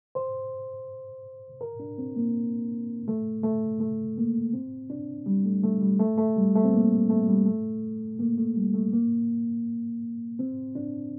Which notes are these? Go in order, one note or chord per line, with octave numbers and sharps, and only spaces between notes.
C5
A#4
D4
C4
A#3
A3
A3
A3
A#3
C4
D4
G3
A3
A3
G3
A3
A3
G3
A3
C4
A#3
A3
G3
A3
A#3
A3
G3
A3
A#3
C4
D4